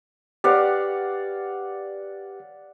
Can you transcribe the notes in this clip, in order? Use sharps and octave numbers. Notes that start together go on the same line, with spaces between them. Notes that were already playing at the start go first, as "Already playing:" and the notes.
G4 B4 C#5 D5 F5 F#5